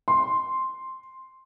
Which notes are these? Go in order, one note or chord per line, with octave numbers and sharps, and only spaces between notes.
C6